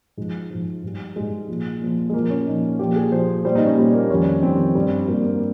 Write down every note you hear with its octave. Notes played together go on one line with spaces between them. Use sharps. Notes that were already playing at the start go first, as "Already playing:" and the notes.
G#2 F3 G#3
G#2 F3
G#2 G3
G#2 G3 G#3
A#2 F3
A#2 F3
G#3
A#2 F3 A#3
C#4
A#2 F3 D#4
A#2 F3 G4
G#4
A#2 F3 C5
A#2 G3 C5
D#4
C#4
A#2 G3
A#3
F2 D#3 G3 C#4
F2 D#3 G3 C4
G2 G3
G2 G3 A#3
A#3